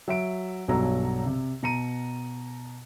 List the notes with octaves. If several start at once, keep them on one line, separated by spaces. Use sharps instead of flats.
F#3 E5 D7
B1 G2 B2 F#3 A#5 E6
C3
B2 A#5 C#7 D#7